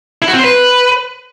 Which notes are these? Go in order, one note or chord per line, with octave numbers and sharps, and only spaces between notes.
E4
F#4
C4
C5
B4